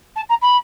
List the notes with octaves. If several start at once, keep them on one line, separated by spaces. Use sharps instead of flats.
A5
A#5
B5